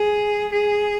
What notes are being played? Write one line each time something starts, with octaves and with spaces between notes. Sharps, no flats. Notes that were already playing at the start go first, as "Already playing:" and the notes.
Already playing: G#4
G#4